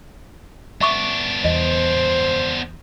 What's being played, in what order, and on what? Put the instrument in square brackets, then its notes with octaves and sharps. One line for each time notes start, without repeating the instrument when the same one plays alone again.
[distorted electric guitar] B3 D4 [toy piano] E5 C#6 D6
[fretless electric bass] E2 [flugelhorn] C5 [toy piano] D#5